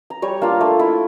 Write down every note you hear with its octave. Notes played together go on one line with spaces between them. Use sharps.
A#5
G3 C#5 C#6
A#3 D4 F4
A3
E4